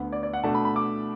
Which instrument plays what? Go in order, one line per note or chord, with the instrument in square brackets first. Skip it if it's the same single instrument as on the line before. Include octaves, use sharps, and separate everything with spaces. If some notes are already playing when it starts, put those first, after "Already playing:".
Already playing: [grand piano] D2 D3 B3
D5
D5
F#5
B2 A3 D4 A5
B5
B5
D6